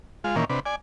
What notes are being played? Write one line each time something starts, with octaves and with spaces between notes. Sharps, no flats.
G#3 F4
A#2 D#3 E3 A#3 C#4
C3 D4 B4
D5 G#5